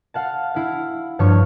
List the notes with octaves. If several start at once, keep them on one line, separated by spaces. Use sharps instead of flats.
F5 F#5 A5
E4 F5
G2 F3 C#5 C#6 F6